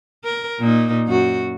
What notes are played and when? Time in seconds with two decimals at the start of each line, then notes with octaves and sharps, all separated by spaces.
0.24 A#4
0.59 A#2 A#3 D#4
1.07 F#2 F#4